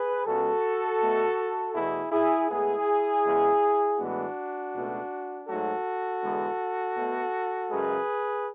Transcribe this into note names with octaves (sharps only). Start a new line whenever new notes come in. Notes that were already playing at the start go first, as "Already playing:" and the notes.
Already playing: G#4 B4
C#2 C#3 G#3 B3 F#4 A4
B2 A3
E2 B2 A3 E4 G#4
E4 G#4
A2 G#3 B3 E4 G#4
E2 C#3 G#3
A2 E3 G#3 B3 D4 F#4
C#2 B2 A3
G#2 F#3 A3 F#4 A4
E2 D3 G#3 B3
B2 A3
F#2 C#3 G#3 G#4 B4